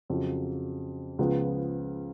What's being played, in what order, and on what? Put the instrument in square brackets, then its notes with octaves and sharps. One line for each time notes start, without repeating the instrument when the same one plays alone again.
[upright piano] F2 C#3 F#3
C#2 C#3 F3 B3